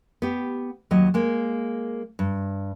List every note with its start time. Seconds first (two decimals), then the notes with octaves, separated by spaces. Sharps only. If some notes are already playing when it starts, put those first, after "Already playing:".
0.22 B3 G4
0.91 D#2 F#3 D#5
1.14 G#3 A#3
2.19 G2